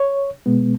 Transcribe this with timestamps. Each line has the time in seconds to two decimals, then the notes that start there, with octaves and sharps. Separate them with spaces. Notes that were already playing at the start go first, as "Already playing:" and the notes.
Already playing: C#5
0.46 B2 G#3 B3